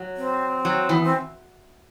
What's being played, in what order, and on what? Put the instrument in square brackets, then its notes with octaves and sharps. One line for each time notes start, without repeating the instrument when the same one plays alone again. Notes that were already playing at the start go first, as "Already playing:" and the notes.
Already playing: [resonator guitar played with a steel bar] F#3
[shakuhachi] C4
[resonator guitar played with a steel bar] F#3
[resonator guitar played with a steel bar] E3 [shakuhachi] B3
[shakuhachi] C4